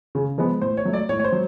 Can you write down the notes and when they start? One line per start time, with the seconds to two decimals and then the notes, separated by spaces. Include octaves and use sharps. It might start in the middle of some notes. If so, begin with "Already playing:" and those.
0.15 C#3
0.38 F3 G#3 B3
0.62 A2 C5
0.77 C#5
0.85 F#3 A3
0.93 D5
1.09 A2 C#5
1.19 C#5
1.24 C5
1.32 F#3